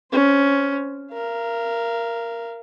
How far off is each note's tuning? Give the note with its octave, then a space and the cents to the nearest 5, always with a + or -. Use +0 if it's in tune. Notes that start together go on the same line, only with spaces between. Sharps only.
C#4 +10 C5 +0
A#4 +0 F5 -35